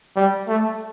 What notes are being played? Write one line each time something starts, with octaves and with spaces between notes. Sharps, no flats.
G3
A3